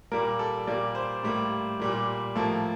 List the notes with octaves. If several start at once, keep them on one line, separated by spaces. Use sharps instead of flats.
A#2 G3 A#3 A#4
A4
A#2 G3 A#3 D5
C5
A2 G3 A#3
A#2 G3 A#3
A2 F3 A#3 A4